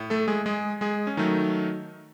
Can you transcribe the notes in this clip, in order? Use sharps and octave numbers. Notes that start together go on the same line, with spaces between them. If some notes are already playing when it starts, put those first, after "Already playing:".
Already playing: A2
A3 A4
G#3 G#4
G#3 G#4
G#3 G#4
C#4
D#3 F#3 A3 D#4